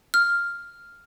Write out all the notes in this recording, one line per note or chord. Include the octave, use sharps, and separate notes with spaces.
F6